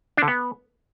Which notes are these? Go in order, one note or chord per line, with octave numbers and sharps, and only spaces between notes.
D4
D3
B3